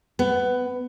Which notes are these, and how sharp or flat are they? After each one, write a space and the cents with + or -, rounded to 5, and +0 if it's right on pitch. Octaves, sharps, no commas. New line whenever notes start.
B3 +15